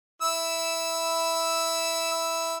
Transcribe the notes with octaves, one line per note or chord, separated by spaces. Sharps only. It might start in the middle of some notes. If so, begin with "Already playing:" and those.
E4 E6